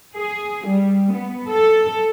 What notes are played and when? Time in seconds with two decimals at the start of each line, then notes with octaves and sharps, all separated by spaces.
0.14 G#4
0.66 G3
1.13 B3
1.49 A4